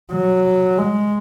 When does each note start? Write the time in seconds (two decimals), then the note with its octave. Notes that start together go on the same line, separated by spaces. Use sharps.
0.12 F#3
0.78 G#3